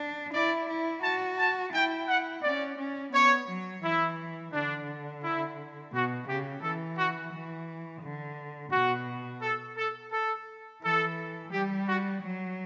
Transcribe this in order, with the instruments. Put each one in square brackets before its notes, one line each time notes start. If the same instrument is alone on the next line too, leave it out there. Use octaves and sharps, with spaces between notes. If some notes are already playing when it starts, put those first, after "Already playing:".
Already playing: [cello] D4
[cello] E4 [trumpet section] D5
[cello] E4
[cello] F#4 [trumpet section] A5
[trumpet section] A5
[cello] E4 [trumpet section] G5
[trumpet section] F#5
[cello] C#4 [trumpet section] D5
[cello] C#4
[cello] B3 [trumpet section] C#5
[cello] F#3
[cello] E3 [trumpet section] E4
[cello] D3 [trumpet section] D4
[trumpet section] E4
[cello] B2 [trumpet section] F#4
[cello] C#3 [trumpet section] G4
[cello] E3 [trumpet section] A4
[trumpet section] F#4
[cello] E3
D3
[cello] B2 [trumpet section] F#4
[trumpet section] A4
A4
A4
[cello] E3 [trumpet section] A4
[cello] G3 [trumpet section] G4
[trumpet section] F#4
[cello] F#3